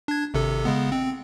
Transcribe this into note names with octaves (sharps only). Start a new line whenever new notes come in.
D4 G#6
G#1 C3 A4
C#3 G#3 B3
C4